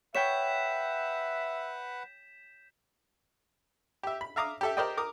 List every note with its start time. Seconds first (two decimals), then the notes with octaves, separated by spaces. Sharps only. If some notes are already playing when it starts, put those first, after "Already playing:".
0.15 B4 C#5 E5 F#5 G5 G6 B6 E7
4.03 G4 E5
4.21 B5
4.36 E5 F5 A#5 D6 D#6
4.61 G4 A4 E5
4.77 G4 A#4 C5 D5 D#5 G5
4.97 A#4 D6 D#6